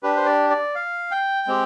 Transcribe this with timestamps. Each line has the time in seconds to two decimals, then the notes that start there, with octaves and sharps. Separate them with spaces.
0.03 D4 G4 B4
0.16 C5
0.26 D5
0.50 D5
0.75 F5
1.11 G5
1.47 G#3 C4 G4